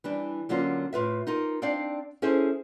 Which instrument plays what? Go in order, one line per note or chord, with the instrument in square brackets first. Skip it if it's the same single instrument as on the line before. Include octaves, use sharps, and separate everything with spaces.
[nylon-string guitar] E3 G3 D4
D3 F#3 A#3 C#4 F4
A2 F4 B4 E5
D#4 F4 A#4
C4 D4 D#4 D5 F5
C#4 E4 G#4 A4 C5